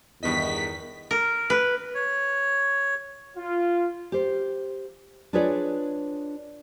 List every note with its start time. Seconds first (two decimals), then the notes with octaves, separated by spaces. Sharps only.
0.23 E2 G2 D#3 B3 D#5 B6
1.11 A#4
1.50 B4
1.94 C#5
3.36 F4
4.12 G4 C5
5.33 D4 F4 G#4 B4 C#5 D5